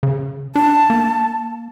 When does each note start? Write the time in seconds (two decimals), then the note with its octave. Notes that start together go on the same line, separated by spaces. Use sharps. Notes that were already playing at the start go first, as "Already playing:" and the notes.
0.03 C#3
0.55 D4 A5
0.90 A#3